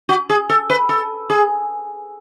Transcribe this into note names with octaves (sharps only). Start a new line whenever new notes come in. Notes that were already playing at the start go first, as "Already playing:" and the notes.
F#4
G#4
A4
B4
A4
G#4